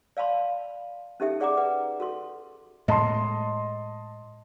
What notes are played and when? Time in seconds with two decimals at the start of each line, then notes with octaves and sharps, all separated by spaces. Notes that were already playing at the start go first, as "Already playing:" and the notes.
0.17 D5 F5 A5 B5 C6
1.20 C#4 D#4 G4 A4 E5 G5
1.40 G#4 D5 F#5 G#5 A#5 D6
1.57 B4 F#5
2.00 F#4 A4 C6
2.88 A2 G#3 D#5 A5 C6